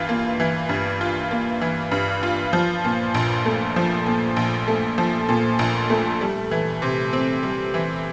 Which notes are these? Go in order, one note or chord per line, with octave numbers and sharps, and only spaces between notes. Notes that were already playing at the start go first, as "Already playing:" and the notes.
Already playing: G2 E3 F4
A#3
E3
G2
F4
A#3
E3
G2
F4
F3
A#2
A#1
A3
F3
A#2
A#1
A3
F3
A#2
A#1
A3
G3
E3
C3
C4
G3
E3